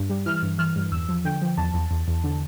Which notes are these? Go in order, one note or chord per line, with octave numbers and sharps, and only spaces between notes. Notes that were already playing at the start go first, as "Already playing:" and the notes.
Already playing: G2
G3
E3 F6
G2
E3 F6
G2
E2 E6
F3
D3 G5
F3
E2 A5
E2
E2
E2
D3